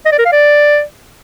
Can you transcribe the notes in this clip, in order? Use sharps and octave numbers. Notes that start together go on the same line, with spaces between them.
D#5
D5
A#4
F5
D5